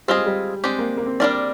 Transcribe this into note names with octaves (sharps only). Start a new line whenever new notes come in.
G3 C4 F4 G#4 D#5
G#3
G3
G#3 C4 D4 G4
A#3
A#3
C4
G3 D4 F4 A#4 D5